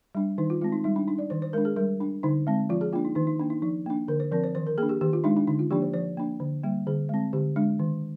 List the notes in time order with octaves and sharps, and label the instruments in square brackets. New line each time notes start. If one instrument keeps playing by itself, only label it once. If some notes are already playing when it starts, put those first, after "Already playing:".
[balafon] G3 D4
D#3 D#4
F4
G#3 C4 F4
D#4
G3 D#4
D4
D4 D#4
D5
D#3 C5
C5
G#3 D4 A#4
G#4
G3 A#4
D4
D3 D#4
G#3 C4
F3 F4
G#4
A#3 D4 F4
D#4
D#3 D#4
D#4
A#3 D4
D#4
F3 D#4
A#3 D4
D3 A#4
C5
F3 C4 A#4
C5
D#3 C5
A#4
A#3 D4 G#4
G4
D#3 G4
F4
G#3 D4 D#4
D4
D3 D#4
F4
F3 A#3 D4 G4
C5
F3 C5
A#3 D4
D3
G3 A#3
D3 G#4
G#3 C4
D3 G4
G#3 D4
D#3